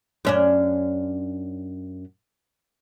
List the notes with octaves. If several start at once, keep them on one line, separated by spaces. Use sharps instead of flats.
F#2 C#4 D4